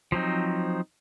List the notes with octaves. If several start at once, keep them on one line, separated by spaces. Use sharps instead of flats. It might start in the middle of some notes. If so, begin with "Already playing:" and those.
F3 F#3 C4 D#4